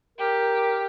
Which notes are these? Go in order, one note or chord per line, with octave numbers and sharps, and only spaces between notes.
G4 A#4